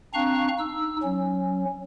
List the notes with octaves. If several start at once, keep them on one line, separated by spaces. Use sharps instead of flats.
C4 D4 F5 A#5 C#6 F#6
D#4 E6
F#3 C#4